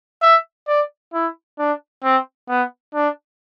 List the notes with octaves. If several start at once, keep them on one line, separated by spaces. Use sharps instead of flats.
E5
D5
E4
D4
C4
B3
D4